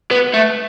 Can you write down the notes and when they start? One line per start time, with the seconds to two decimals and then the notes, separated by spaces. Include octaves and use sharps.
0.11 B3
0.34 A3